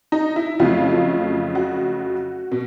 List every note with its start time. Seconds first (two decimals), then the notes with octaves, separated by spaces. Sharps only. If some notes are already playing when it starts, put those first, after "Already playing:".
0.12 D#4
0.36 E4
0.59 F2 C#3 F#3 A3 F4
1.55 F#4
2.52 B2